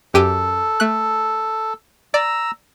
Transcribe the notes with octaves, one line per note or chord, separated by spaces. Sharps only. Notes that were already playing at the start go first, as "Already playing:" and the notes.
F#2 G4 A4 D#7
A3 F#6
D5 A#5 E6